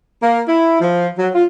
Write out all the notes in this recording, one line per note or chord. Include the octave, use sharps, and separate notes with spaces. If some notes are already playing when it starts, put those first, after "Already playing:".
A#3
E4
F3
F#3
F4